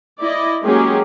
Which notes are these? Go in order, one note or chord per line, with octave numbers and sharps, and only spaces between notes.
E4 D5 D#5
F#3 G#3 A#3 C#4 G4 G#4